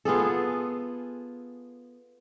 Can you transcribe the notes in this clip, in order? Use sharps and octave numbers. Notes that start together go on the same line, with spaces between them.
B3 F4 G#4 A4